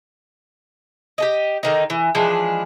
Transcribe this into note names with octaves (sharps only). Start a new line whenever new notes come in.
G4 A4 D#5
D3 D#3 D#4
E3
E3 F3 G#3 D4